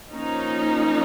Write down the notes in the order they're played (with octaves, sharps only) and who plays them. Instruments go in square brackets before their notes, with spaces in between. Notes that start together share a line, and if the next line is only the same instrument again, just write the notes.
[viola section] F3 A#3 C#4 D#4